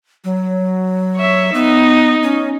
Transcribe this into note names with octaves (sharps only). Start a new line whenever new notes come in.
F#3
C#5 E5
B3 D#4
C#4